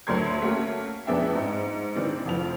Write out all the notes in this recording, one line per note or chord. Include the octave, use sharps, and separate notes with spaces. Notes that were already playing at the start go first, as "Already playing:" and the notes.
D2 F#3 A3 A#4 C6 G#6
A3 A#3 C#4 F#4 A#4
F2 B3 D4 G#4 E5 G5
G#2
D#3 E3 C4 D4
F1 E3 F3 F7